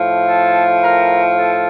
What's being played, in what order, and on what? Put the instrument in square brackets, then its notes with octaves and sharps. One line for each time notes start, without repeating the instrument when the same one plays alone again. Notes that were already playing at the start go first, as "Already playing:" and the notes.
Already playing: [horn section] A2 F3
A4
A#4
A4